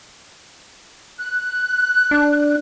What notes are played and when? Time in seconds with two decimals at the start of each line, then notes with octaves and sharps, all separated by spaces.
1.18 F#6
2.11 D4